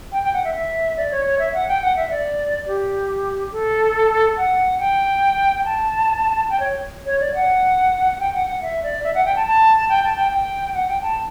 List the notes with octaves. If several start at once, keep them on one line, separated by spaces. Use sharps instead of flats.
G5
G5
F#5
E5
E5
D5
C#5
C#5
E5
F#5
G5
F#5
E5
D5
G4
A4
F#5
G5
G5
A5
G5
C#5
C#5
D5
F#5
G5
F#5
F#5
E5
D5
E5
F#5
G5
A5
A5
G5
A5
G5
G5
F#5
G5
A5